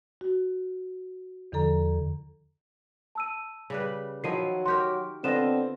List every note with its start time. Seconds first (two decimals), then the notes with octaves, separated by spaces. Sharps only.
0.21 F#4
1.52 E2 D3 F3 A4 A#5
3.15 A5 E6 D#7
3.70 C#3 G3 B4
4.24 D#3 F3 F#3 E4 C7 D#7
4.66 F#4 G4 A#4 C6 G6
5.24 D3 B3 C4 F4 D#5 A#6 E7